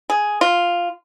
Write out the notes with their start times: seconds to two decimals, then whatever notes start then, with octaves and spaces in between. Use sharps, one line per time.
0.10 G#4
0.41 F4